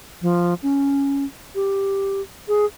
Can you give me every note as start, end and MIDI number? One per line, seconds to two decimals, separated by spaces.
0.22 0.54 53
0.63 1.25 61
1.55 2.22 67
2.48 2.66 68